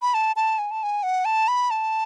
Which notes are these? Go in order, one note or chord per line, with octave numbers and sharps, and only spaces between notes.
B5
A5
A5
G#5
A5
G#5
F#5
A5
B5
A5